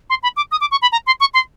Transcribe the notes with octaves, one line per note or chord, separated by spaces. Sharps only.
C6
B5
D6
D#6
D6
C#6
B5
A#5
C6
C#6
C6